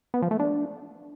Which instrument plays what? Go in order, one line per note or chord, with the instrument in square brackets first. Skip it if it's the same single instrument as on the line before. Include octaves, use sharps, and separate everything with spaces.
[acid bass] B3
F3
A3
D4